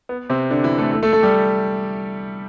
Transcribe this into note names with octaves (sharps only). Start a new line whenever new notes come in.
B3
C3 C4
D3 D4
E3 E4
A3 A4
A3 A4
A3 A4
A3 A4
G3 G4